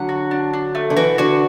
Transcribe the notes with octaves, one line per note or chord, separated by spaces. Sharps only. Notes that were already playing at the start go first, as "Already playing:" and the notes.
Already playing: D3 F#3 F#5
F#4
D4
D4
A3
D3
E3 F#4
D3 F#4